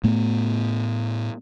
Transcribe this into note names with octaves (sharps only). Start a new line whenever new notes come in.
A2 A3 B3